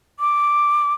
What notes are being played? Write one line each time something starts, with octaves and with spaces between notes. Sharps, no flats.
D6